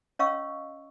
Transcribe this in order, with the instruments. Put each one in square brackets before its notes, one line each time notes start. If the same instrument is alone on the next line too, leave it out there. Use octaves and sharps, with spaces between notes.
[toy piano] C#4 C#5 D#5 F5 C#6 E6